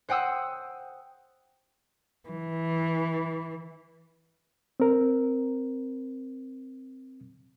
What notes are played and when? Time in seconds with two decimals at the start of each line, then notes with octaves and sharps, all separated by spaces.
0.09 C5 F#5 G5 D#6 E6
2.28 E3
4.80 C4 A#4